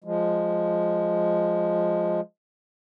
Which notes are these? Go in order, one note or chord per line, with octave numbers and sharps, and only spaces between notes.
F3 G#3